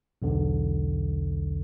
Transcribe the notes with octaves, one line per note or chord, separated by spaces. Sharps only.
B1 E2 D3